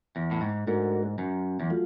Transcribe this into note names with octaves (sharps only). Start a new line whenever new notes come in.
E2
A2
G#2
G#2 A3 D4 F#4 A#4
F#2
E2
F#3 A3 F4